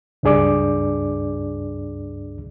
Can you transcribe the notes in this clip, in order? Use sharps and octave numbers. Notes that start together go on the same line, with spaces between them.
C#2 G2 D4 G#4 D5 D6